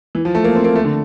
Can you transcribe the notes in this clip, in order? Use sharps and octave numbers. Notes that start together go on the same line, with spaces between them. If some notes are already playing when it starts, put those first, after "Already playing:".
E3
F3
A3
A#3
C4
A#3
A3
D3